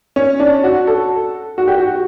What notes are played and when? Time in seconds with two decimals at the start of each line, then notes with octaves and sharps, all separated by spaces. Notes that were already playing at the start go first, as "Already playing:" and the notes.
0.16 C#4
0.40 D4
0.64 F#4
0.87 A4
1.58 F#4
1.68 G4
1.78 F#4